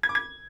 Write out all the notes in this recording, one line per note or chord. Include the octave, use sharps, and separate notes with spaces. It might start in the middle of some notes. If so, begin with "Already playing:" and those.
G#6
D6
G#6